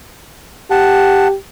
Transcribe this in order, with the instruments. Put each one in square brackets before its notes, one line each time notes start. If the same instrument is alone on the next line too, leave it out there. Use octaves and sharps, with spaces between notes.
[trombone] G4 [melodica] F#5 A5